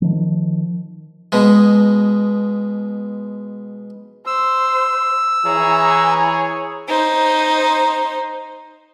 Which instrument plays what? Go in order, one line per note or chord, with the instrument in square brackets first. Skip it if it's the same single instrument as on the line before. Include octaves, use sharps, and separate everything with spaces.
[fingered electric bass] D#3 F3
[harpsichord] B2 G#3
[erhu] C5 [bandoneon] E6
[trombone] E3 [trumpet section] G#4 C#5 [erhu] A#5
[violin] D#4 C5